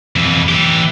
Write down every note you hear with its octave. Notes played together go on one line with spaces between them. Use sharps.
F2 E3
E3 G4